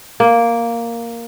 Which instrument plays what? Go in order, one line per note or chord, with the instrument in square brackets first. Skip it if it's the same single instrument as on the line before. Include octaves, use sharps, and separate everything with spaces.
[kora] A#3